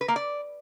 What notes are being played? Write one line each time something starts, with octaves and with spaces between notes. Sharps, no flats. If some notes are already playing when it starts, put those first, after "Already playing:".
B4
A#3
D5